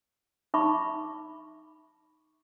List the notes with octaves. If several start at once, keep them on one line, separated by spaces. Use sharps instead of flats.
D#4 E5 B5 C#6 D6